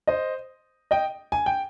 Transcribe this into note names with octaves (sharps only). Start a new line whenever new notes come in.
C5 D#5
D#5 G5
G#5
G5